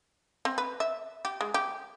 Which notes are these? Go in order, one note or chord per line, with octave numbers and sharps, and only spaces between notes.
C4
B4
E5
G4
G#3
G4